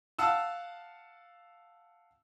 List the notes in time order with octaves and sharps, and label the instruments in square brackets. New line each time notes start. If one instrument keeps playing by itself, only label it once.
[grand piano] F5 F#5 A5 E6